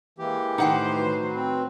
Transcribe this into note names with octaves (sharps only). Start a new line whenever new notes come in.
E3 G#3 A#3 G4
A2 D#3 D#4 C5 F#5 G5
F#3 F#4 B4
C4